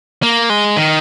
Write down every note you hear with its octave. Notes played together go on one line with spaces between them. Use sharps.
A#3
G#3
D#3